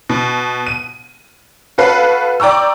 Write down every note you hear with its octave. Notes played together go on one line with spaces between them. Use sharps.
B2
D#7
F#4 A4 B4 F5
D5 G5 A#5 C#6 E6